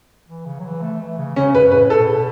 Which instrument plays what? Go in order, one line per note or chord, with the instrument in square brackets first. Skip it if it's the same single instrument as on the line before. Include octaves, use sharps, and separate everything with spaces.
[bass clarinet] E3
C#3
F#3
E3
A3
E3
C#3
[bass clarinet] C#3 [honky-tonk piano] C#4
[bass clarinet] F#2 [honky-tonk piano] B4
[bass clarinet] A2 [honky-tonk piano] B4
[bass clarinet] B2 [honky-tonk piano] A4